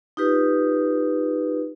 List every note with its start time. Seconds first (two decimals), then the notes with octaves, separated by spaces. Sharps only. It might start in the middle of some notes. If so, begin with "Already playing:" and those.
0.17 D#4 F4 G4 B4